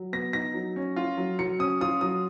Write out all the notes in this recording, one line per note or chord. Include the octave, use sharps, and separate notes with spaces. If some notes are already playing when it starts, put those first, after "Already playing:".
Already playing: F#3
B3 A#6
D#4 A#6
F#3
C#4
F4
F#3
F#3 C#7
C#4 D#6
F4 D#6
F#3 D#6